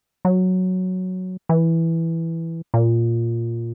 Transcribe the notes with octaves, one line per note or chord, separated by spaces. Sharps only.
F#3
E3
A#2